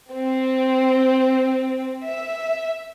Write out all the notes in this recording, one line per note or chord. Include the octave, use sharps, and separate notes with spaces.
C4
E5